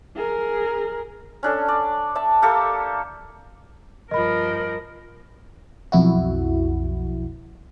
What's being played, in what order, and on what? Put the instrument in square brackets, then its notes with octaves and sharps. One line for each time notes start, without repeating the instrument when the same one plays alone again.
[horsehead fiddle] G#4 A#4
[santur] C#4 D4 A4
D5
D5 E5 A5
A#3 G4 A4
[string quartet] G2 F3 [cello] A#4 [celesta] D#5 B5
[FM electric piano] B1 F2 E4 F#4